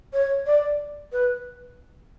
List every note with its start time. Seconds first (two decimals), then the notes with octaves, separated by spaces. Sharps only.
0.13 C#5
0.46 D5
1.12 B4